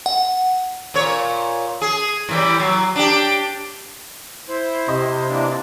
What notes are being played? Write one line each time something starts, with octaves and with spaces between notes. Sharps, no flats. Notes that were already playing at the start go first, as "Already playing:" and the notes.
F#5
A#2 C#5
G#4
A2 E3 G3
F#3
D4 G4
E4 C5
C3 D#5 C6
E3 A#3 D4